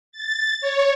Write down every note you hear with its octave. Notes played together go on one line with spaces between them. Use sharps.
A6
C#5